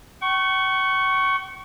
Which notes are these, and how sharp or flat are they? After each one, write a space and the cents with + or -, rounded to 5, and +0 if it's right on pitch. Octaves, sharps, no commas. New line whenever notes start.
G5 -45 C#6 +0